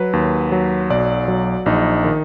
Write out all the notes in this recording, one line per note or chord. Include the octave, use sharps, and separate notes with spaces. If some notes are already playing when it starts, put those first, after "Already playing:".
Already playing: F#3 B4
D#2
F#3
B1 D5
F#3
A#1 D#4
D#3